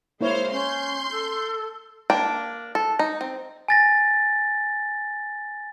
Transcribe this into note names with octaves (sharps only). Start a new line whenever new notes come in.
G#3 A#3 E4 C5 C#5 F5
C#4 C6 G6
A4
A#3 D4 G5
A4
D#4
C4
G#5 A6 A#6